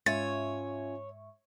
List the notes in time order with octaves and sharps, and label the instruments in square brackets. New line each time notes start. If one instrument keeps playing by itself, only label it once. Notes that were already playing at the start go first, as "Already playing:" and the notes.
[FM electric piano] G#2 E5 C#6 [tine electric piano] C#4 F4 G#5 [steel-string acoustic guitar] C#5 [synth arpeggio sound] A6